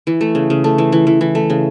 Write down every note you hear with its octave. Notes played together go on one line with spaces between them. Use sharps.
E3
A3
C#3
C#3
A3
E3
E3
E3
E3
A3
C#3